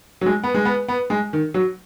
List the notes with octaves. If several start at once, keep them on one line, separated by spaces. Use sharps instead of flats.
F#3
G#3
B3
G#3
B3
B3
G#3
D#3
F#3